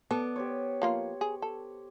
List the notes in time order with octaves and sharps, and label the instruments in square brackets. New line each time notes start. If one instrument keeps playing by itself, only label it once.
[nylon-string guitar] B3 [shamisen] A4 [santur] D5
[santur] G4 C5 C#5
[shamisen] F3 A#3 F4
G#4
A4